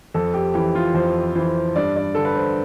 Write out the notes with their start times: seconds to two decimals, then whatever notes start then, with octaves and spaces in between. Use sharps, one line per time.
0.14 F2 A4
0.34 G4
0.54 E3 G4
0.75 F4
0.94 F2 C5
1.35 E3 C5
1.76 G2 D5
1.96 D5
2.15 D3 A4
2.25 B4
2.36 C5